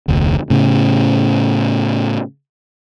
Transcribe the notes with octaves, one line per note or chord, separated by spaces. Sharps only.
F1 D2
A2 C#3